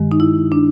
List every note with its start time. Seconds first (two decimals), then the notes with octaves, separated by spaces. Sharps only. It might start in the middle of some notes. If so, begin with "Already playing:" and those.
Already playing: G2 D#3 G#3
0.12 D#4
0.20 E4
0.52 D4